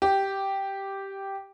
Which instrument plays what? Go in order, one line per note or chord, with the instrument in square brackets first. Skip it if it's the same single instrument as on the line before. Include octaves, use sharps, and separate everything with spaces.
[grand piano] G4